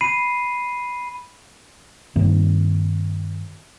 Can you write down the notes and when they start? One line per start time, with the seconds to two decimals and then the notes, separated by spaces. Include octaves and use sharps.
0.01 B5 C7 D#7
2.16 G2 D#3 A#3 C4